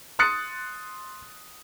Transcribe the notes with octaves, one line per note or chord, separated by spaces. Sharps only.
C6 D#6 F#6 A6 C#7